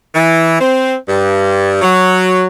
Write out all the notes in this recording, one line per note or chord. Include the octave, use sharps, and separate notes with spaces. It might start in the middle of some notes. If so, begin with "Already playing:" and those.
E3
C4
G2
F#3